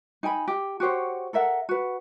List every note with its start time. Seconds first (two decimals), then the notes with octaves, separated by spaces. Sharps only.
0.23 D#4 G5 G#5 B5
0.48 G4
0.80 F#4 G4 C5 C#5
1.33 A4 A#4 E5 F#5
1.69 F#4 B4